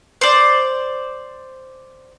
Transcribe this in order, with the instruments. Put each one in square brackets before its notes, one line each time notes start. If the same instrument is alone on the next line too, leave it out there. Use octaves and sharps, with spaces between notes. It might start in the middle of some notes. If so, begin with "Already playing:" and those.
[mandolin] C5 D5